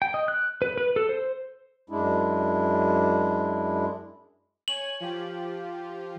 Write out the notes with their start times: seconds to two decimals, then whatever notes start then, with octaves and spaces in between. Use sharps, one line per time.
0.02 G5
0.14 D#5
0.28 F#6
0.62 B4
0.78 B4
0.96 A4
1.09 C5
1.90 F#2 G#3 D4 E4
4.68 C#5 G#5 F#7
5.00 F3 F4 G4